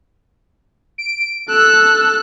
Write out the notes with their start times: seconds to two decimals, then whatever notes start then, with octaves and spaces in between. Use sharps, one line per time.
0.98 D7
1.49 A4 E6 F#6